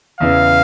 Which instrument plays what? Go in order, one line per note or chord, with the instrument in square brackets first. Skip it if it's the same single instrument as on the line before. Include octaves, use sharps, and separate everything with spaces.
[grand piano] E2 C#3 E3 [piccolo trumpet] F5